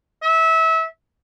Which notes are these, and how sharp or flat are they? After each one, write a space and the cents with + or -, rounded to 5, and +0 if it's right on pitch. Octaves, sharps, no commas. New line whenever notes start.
E5 -25